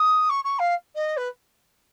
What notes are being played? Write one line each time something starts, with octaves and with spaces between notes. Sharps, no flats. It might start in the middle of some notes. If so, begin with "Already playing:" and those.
Already playing: D#6
C#6
C#6
F5
D#5
B4